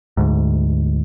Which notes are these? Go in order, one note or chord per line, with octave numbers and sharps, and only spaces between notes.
D2 G#2